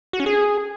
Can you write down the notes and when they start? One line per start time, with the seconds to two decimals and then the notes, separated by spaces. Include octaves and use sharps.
0.13 F#4
0.20 C#4
0.26 G#4